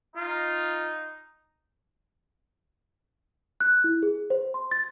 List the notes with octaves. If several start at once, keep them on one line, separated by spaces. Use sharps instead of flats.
D#4 F4
F#6
E4
G#4
C5
C6
A6